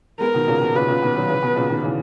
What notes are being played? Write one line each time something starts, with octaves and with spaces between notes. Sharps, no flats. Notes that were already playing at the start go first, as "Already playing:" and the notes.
G#3 B3 A#4
B2 D#3
A#2 C#3
B2
A#2 C#3 B4
A#2 C#3
B2 D#3
D#3 F#3
C#3 E3
B2
A#2 C#3
B2 D#3
C#3 E3